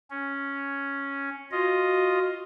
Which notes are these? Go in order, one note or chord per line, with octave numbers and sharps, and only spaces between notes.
C#4
F4 F#4 D#5